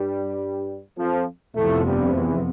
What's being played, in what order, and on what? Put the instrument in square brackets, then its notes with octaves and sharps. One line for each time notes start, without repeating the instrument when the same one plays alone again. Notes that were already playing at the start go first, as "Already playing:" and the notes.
Already playing: [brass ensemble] G2 G3
F2 F3
[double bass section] F1 F2 C3 F3 B3 [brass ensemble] A2 A3
[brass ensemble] G2 G3
E2 E3